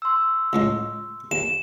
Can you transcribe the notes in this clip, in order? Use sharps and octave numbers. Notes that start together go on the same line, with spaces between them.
C6 E6
C#2 A2 G#3
D#2 E7